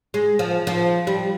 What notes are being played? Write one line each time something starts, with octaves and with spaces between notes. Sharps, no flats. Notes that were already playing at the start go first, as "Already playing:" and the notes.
G#3
F3
F3
G3